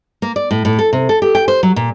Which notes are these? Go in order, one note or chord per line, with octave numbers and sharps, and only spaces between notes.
A#3
D5
A2
A2
A4
C3
A4
G4
G5
C5
F#3
A#2